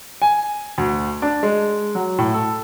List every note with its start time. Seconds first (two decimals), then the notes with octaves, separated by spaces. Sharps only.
0.22 G#5
0.78 D2
1.22 D4
1.43 G#3
1.95 F#3
2.18 A2
2.34 A4